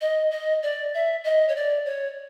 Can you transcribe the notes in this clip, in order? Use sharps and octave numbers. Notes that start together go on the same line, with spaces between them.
D#5
D#5
D5
E5
D#5
C#5
D5
C#5